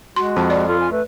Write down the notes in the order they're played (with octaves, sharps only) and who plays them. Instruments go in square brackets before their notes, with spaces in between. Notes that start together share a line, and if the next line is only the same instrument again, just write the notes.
[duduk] G#3 [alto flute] F#4 [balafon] C6
[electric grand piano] F2 [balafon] A5
[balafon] D5
[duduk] F4 [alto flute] A4
[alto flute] G#5
[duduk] A3 [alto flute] B4